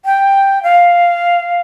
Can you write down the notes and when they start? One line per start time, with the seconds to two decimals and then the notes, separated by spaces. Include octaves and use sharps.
0.05 G5
0.63 F5